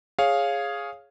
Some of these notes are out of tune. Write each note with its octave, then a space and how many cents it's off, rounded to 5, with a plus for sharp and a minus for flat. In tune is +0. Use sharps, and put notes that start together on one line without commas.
G#4 +0 C#5 +0 F5 +0